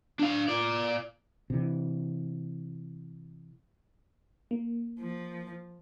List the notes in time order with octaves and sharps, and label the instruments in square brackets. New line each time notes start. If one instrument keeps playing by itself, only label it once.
[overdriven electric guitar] D4 F5
F4 D5
[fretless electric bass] C3 E3
[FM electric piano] A#3
[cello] F3